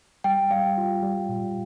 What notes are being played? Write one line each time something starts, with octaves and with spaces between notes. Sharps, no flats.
G3 G5
G3 F5
F4
G3
A#2